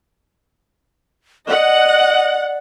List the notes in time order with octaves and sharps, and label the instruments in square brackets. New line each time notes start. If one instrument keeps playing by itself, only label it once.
[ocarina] D5 [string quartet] D#5 [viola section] F#5